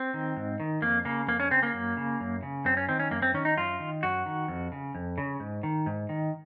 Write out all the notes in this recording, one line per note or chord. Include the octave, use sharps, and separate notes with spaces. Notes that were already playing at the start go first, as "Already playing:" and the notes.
Already playing: C4
D#3
G#2
D#3
F2 A#3
C#3 A#3
F2 A#3
C#4
C#3 C4
A#3
F#2
C#3
F#2
C#3
F#2 C4
C#4
D#3 C4
C#4
F#2 A#3
C4
D#3 C#4
D#4
F#2 F4
D#3
F#2 F#4
D#3
F2
C#3
F2
C#3
G#2
D#3
G#2
D#3